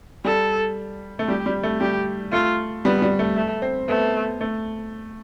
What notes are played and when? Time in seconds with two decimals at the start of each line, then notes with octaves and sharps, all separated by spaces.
0.25 G3 A4
1.19 A3
1.28 G3 G4
1.46 G3
1.63 A3
1.80 G3 G4
2.32 A3 F4
2.85 G3 B3
3.02 G3
3.19 A3
3.36 A3
3.62 C4
3.88 A3 B3
4.41 A3